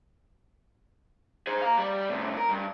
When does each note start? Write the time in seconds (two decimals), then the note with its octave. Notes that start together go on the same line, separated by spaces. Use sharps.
1.47 G#4 C5
1.61 F5 A#5
1.77 G3 D5
2.10 A2 C3
2.37 A#4
2.49 G2